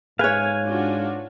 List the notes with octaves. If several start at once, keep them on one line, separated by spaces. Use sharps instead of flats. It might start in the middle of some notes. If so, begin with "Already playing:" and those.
G#2 B4 C#5 F5 G#5
D4 F4 F#4